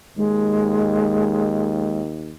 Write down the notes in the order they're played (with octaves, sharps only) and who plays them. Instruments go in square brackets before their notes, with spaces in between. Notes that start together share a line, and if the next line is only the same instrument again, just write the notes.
[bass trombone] D#2 [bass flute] G#3